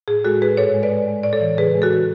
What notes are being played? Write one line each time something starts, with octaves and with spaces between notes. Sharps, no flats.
A2 G#4
G#3 F#4 A4
G#3 G#4 B4
G#2 A4 C#5
G#3
B4 D5
G#3
G#3
A2 D5
A4 C#5
E3
C#3 G#4 B4
G#3
F#4 A4
E3